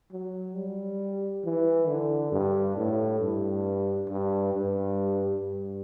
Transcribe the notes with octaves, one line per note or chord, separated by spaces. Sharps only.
F#3
G3
E3
D3
G2
A2
G2
G2
G2
G2